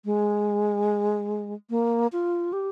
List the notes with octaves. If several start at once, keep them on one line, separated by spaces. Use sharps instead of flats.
G#3
A#3
F4
G4